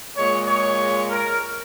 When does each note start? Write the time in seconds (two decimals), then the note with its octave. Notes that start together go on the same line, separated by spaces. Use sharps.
0.16 A#2 G#3 C#5
0.48 C#5
1.10 A#4